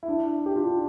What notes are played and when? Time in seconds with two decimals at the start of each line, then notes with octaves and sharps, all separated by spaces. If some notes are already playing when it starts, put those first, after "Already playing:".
0.03 E4
0.08 D4
0.46 G4
0.56 D4 F4